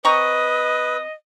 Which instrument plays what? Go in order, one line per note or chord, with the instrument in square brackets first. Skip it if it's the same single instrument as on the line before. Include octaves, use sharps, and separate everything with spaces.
[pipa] C4 A#5 C#6 [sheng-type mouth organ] B4 [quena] D#5 [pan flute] D#6